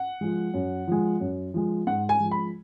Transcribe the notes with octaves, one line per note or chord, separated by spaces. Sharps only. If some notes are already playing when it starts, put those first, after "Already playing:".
Already playing: F#5
F3 G#3
F#2
F3 G#3
F#2
F3 G#3
G#2 F#5
G#5
F3 G#3
B5